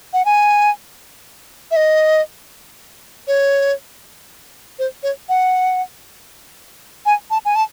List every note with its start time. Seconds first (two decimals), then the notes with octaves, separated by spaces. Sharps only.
0.13 F#5
0.25 G#5
1.71 E5
1.76 D#5
3.27 C#5
4.79 C5
5.03 C#5
5.29 F#5
7.06 G#5
7.30 A5
7.45 G#5
7.55 A5